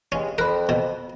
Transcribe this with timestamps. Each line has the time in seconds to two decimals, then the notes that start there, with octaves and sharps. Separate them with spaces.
0.12 G2 C#3 G#3 C#4
0.38 F2 A#4 B5 F#6
0.69 B2